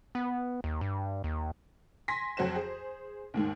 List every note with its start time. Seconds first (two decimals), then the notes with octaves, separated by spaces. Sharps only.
0.15 B3
0.64 D#2
0.81 G2
1.24 D#2
2.08 G#5 C6 A#6 B6
2.37 F2 F#3 F#4 C5 E7
2.55 G#4 C5
3.34 D#2 G#2 D#3